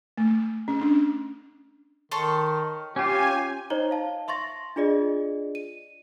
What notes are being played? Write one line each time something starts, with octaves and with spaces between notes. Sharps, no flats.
A3
C#4
D4
D#3 A4 C#5 C6
C#4 F4 G4 G#5
D#4 C5 C#5 D#5 A#5 G7
F5 A5
E5 C6 C#6 A6 A#6
D4 F4 G#4 D5 D#5
D#7